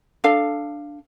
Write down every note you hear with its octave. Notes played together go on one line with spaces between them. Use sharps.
D4 A4 F5